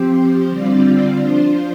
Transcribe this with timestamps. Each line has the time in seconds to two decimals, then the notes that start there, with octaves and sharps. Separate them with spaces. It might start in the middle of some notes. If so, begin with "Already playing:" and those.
Already playing: F3 C4 G4 C5
0.49 D3 G3 C4 F4 D5
1.17 F3 D4 F4 C5